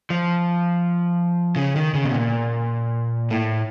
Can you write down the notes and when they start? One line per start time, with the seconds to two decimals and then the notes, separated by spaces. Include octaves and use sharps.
0.10 F3
1.56 C#3
1.76 D#3
1.94 C#3
2.05 B2
2.14 A#2
3.30 A2